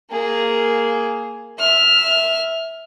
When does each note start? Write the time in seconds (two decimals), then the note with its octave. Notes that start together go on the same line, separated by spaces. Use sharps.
0.10 A#3 G#4
1.58 E5 F6